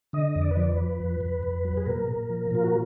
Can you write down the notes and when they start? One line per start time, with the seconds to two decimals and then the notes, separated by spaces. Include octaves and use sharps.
0.13 D3 D#5
0.35 F2
0.42 D5
0.51 B4
0.57 F3 D5
0.72 B4
0.78 F3
1.00 F2
1.21 F2
1.43 F2
1.65 F#3
1.77 G#4
1.86 A#2 A#4
2.08 A#2
2.30 F3
2.51 A#2 F4
2.64 F#4